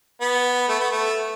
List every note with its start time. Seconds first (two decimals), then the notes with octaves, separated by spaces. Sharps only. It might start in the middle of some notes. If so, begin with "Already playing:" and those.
0.21 B3
0.68 A3
0.79 B3
0.91 A3